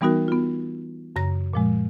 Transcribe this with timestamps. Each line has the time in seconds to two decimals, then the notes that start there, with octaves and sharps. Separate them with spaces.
0.01 E3 G3 B3 D#4 F#4 A#4
0.28 B3 F4
1.16 F#2 C#3 A#5 A#6
1.53 A#2 F3 G#3